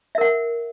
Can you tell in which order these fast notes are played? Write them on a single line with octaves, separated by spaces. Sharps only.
E5 A#4 F#5